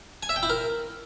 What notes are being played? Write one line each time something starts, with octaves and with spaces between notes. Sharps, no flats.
G#5
E5
G5
E4
A#4